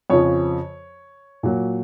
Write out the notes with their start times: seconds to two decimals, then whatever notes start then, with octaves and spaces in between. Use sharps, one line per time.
0.10 F2 C#3 F3 C#5
1.43 A#2 F#3